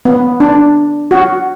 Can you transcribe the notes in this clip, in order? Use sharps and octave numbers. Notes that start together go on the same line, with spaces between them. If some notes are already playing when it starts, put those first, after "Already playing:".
B3
D4
F#4